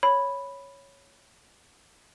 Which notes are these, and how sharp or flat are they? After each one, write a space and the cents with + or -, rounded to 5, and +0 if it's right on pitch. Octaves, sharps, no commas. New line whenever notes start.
C#5 +0 B5 +0